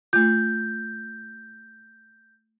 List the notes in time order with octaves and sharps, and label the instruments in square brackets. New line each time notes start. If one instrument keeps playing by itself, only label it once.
[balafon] A3 F4 [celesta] G6